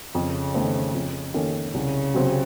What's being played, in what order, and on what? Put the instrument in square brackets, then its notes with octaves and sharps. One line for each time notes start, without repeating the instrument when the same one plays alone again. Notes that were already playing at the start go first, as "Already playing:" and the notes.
[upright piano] F2 [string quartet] C#3
[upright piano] D#3 A3 C4
F2
D#3 A#3 C#4 A4
[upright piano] C2 [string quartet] C#3
[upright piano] C3 F#3 C4